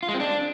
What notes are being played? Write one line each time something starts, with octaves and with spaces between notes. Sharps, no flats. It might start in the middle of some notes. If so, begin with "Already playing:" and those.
F4
G#3
C4
D4